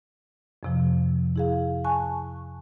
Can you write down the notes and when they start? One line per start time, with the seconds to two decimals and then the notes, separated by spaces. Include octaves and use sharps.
0.63 F2 C3 F3
1.36 E4 G#4 F5
1.84 G#5 A5 C#6 F#6